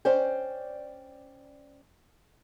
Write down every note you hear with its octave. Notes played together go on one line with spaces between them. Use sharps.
C#4 C5 D5 G5